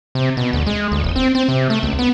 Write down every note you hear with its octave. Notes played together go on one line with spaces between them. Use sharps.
C3
B2
D2
G#3
D2
E1
C4
C4
C3
A3
C#2
B3